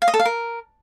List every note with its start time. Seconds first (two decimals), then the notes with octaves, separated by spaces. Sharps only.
0.02 F5
0.08 D#5
0.14 A4
0.20 F5
0.25 A#4